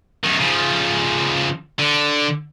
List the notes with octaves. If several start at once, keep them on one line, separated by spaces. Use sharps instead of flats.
F#2 D#3
C#3 F3
D3